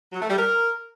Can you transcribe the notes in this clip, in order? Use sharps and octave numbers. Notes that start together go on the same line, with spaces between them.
F#3
A3
G3
A#4